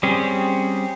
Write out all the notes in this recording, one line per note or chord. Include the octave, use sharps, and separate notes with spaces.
G3 C4 C#4 G#4